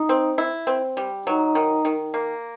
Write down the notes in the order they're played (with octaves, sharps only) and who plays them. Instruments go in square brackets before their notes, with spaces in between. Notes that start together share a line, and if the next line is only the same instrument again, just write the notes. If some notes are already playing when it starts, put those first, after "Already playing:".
Already playing: [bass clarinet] D#4
[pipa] C4
E4
C4
G3
[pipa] F#3 [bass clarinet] D#4
[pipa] D#3
D#3
A#3